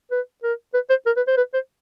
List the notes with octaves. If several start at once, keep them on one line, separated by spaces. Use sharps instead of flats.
B4
A#4
B4
C5
A#4
B4
C5
B4
C5